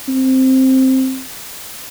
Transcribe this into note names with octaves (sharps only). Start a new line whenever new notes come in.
C4